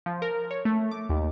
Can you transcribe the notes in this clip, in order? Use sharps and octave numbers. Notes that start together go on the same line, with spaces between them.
F3
A#4
C#5
A3
D6
D#2